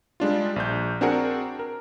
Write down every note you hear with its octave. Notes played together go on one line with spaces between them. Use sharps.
G3 G#3 D4 F4
A#1 G6
C4 D4 F#4 G#4 A#4 F#5
A#4